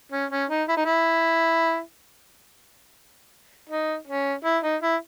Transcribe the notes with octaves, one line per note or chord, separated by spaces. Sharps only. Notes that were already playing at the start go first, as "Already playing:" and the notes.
C#4
C#4
D#4
E4
D#4
E4
D#4
C#4
E4
D#4
E4